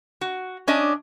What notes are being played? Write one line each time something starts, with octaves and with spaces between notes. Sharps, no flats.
F#4
C#4 D4 D#5